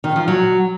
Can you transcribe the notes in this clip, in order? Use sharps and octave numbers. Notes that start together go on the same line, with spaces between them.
D#3
F3
F#3